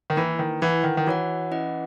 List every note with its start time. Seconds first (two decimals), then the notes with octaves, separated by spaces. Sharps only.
0.10 D#3
0.16 E3 A#3 E4 B4
0.39 D#3
0.62 E3 E4 B4 F#5
0.84 D#3
0.97 D#3
1.07 E3 F#4 C#5 F#5
1.51 C#4 E4 B4 D#5 F#5